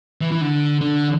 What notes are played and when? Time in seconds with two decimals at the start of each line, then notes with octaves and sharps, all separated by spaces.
0.21 E3
0.31 E3
0.41 D3
0.81 D3